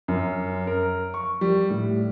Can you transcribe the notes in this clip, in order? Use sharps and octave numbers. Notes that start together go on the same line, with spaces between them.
F#2
A#4
C#6
G3
A2